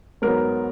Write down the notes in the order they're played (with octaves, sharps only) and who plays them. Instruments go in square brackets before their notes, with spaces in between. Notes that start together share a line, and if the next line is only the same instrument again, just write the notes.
[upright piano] G#2 F#3 B3 A#4